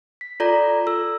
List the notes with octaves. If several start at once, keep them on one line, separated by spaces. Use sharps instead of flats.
B6
F4 A4 D5 A#5
A4 E6